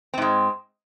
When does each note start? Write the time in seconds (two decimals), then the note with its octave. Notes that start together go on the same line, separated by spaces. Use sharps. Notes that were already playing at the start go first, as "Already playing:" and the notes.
0.14 C4
0.18 G#2
0.22 G#3